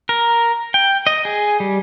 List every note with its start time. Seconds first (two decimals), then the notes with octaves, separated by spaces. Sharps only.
0.09 A#4
0.74 G5
1.07 D#5
1.25 G#4
1.60 G3